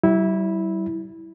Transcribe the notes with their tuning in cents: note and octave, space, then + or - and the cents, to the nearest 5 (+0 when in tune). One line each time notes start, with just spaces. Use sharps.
G3 -40 E4 -10